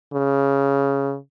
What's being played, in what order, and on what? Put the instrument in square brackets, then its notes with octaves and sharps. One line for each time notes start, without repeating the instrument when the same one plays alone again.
[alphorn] C#3